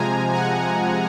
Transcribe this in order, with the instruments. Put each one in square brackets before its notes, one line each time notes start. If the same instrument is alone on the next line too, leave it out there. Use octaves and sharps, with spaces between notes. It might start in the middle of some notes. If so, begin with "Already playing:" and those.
Already playing: [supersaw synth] C3 F3 G#3 G#5 A#5
F#5 G#5